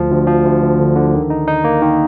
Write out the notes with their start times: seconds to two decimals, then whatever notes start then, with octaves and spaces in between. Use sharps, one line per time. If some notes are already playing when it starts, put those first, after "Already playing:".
Already playing: D2 F3
0.10 D2
0.27 F3
0.45 D2
0.62 D2
0.79 D3
0.96 D3
1.14 D#3
1.30 D#4
1.47 D#4
1.64 A#3
1.82 D#3